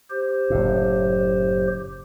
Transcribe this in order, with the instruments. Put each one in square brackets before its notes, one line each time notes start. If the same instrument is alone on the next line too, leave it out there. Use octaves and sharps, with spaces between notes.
[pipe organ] G4 C5
[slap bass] F#1 A2